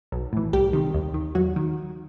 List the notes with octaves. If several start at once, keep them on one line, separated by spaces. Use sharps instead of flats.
B1
A2 E3
C2 G3 G4
C3 D#3
D#2
D#3
E2 F#3 F#4
D#3